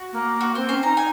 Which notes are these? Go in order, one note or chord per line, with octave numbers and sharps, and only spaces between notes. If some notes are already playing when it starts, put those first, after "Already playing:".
Already playing: F#4
A#3
F#4
C4 C5
C#4 C5
D#4 A#5
G#5